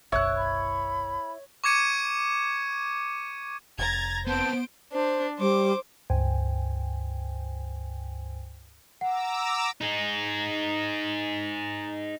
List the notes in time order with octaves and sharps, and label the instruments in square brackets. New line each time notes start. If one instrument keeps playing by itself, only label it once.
[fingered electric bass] F#1 B1 F#2 [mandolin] E4 D#6 F#6 [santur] C#5
[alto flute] B5
[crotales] C#6 D6 G#6 C#7 D#7
[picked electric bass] F1 [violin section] A#5 G#6 A6
[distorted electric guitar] B3 C4 [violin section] C5 D7 [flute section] A5 G6
[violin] D4 [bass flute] C5
[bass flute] G3 [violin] C5 D6
[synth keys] C#2 G2 C5 G5 G#5
[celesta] F#5 [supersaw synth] A#5 D6 E6
[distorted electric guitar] D#4 G#4